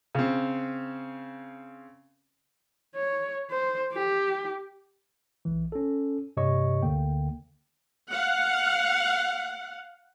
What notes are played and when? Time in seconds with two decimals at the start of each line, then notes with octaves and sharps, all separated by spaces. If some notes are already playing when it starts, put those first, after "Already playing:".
0.15 C#3 C4
2.95 C#5
3.50 C5
3.93 G4
5.45 B1 E3
5.72 C#4 A4
6.37 G2 C3 G4 C#5 D#5 C#6
6.83 D2 D3 A#3 G5
8.12 F5 F#5